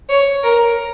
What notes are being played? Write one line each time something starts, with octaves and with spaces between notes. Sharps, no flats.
C#5
A#4